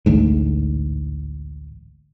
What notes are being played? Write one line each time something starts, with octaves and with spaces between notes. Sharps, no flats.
A1 D2 G#2